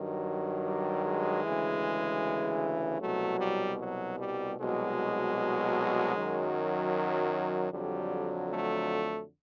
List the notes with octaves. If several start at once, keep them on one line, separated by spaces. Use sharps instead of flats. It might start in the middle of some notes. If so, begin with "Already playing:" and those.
Already playing: G2 D#3 F#3
G3
G#3
D2 C#3 E3
C2 B2 F#3 A3
G3
F#3
G3
C2 B2 F#3 G#3
F#2 D#3 F#3
F2 D3 F#3 G3
A3